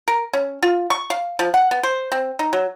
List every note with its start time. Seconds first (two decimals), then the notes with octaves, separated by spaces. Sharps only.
0.08 A#4
0.33 C#4
0.63 F4
0.90 C#6
1.10 F5
1.39 F3
1.54 F#5
1.71 B3
1.83 C5
2.12 C4
2.39 D#4
2.53 F#3